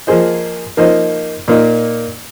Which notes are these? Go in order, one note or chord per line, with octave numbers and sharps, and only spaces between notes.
F3 A#3 G#4 C5 D#5
F3 A#3 D#4 C5 D#5
A#2 A#3 D#4